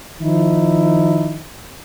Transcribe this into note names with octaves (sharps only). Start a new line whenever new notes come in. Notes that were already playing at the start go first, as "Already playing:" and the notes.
D#3 F3 D#4 E4